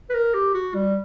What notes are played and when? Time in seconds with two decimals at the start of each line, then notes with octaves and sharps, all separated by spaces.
0.10 B4
0.14 A#4
0.34 G4
0.54 F#4
0.75 G3